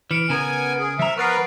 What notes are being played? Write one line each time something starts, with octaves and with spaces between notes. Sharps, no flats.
E3 F6 C#7 D7
C#3 B3 A#4 G#5
G#4
F3 E5 A#5
B3 A#4 B4 C#6 A6 C7